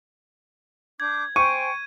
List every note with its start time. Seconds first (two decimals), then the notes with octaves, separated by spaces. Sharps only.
1.00 D4 D6 G6 G#6
1.36 C5 G5 G#5 C#6 D#7